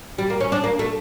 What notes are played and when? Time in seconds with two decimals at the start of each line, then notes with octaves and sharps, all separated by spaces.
0.18 G3
0.30 A#3
0.40 C#4
0.52 D4
0.64 A#3
0.79 A3